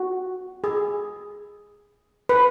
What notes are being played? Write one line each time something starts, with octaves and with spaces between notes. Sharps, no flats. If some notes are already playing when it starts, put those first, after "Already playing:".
Already playing: F#4
G#4
B4